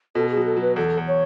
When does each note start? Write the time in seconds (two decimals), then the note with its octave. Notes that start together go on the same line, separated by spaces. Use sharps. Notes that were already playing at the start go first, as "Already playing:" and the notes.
0.15 B2 A4
0.31 G#4
0.36 F#3
0.46 A4
0.57 F#3
0.62 B4
0.76 E2 A4
0.97 E2
1.08 C#5